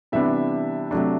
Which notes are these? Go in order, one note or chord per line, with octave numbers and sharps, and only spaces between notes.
C3 E3 G3 B3 D4 E5
C3 F#3 A3 D4